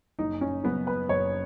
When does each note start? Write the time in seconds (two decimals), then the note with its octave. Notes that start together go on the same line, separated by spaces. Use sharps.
0.19 F#1 D#4
0.41 C#4
0.63 F#2 C#3 B3
0.87 B4
1.09 F#1 C#5